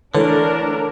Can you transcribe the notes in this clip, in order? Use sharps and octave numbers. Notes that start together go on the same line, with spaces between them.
D3 E3 A3 D4 A#4 B4 C#5